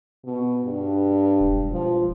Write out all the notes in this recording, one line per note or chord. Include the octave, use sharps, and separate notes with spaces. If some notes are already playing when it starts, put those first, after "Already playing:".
B2
G2
E1
F3